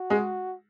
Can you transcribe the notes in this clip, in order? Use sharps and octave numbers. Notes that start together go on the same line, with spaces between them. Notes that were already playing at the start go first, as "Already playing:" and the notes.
Already playing: F#4
G#3